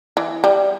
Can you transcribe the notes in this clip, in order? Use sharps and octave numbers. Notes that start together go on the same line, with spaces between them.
E3
G3